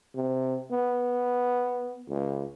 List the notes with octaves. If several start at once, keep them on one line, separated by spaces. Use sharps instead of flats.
C3
B3
C#2